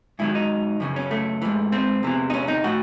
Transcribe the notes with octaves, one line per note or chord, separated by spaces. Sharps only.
G#2 D#3 F#3 E4
D#4
F#2 C#3 E3
C#4
A3
G#2 E3
C4
E2 C3 E3
D#4
C#4
D#4
A2 F#4